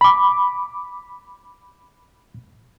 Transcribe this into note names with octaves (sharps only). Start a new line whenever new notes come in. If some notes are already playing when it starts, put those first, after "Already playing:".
B5 D6